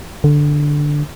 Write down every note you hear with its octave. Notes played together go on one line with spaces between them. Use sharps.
D3